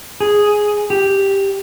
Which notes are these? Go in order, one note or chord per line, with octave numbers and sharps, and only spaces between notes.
G#4
G4